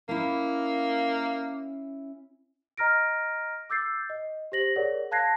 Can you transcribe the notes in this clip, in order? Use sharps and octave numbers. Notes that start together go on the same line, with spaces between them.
A#3 C#4 E4
D#5 A#5 F6 A#6 D7
D6 E6 G6 A6 C7
D#5
G4 C5 A#6 F#7
G#4 A#4 C#5 D5 F#5
F5 A5 F#6 G#6 A#6 C7